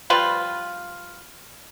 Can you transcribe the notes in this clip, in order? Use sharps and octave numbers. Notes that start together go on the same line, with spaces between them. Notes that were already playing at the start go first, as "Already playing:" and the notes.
F3 G3 F4 B4